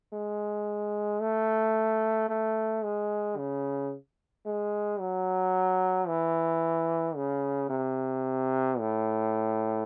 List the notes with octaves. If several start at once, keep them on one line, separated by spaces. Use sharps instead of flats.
G#3
A3
A3
G#3
C#3
G#3
F#3
E3
C#3
C3
A2